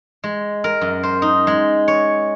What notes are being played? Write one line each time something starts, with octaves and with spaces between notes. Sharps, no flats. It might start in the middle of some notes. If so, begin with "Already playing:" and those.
G#3
A#4
F#2
C5
D#4
G#3
C#5